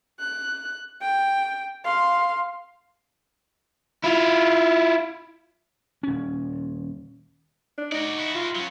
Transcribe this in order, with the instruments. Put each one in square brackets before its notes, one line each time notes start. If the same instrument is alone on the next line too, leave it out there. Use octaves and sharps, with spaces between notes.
[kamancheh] F#6
G5
F5 C6
[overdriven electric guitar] E4 F4
[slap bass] D#1 C#4
[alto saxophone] D4
[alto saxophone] D#4 [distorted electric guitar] F#4 D5
[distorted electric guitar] E4 F#4
[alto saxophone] F4
[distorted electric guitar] F#3 C#4